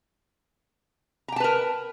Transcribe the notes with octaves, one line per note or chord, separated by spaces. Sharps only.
A#4 B4 G5 A5 A#5